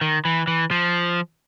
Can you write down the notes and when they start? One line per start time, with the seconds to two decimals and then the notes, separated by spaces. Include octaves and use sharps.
0.01 D#3
0.25 E3
0.47 E3
0.71 F3